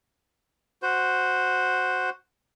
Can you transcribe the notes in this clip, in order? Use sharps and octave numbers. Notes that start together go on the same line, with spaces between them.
F#4 C5